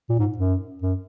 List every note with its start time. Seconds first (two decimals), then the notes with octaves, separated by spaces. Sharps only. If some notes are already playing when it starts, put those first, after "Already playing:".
0.10 A#2
0.19 G#2
0.38 F#2
0.82 F#2